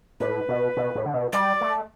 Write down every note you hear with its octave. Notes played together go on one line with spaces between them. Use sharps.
A2 B4
B2
B2
A2
D3
B2
G3 D5
A3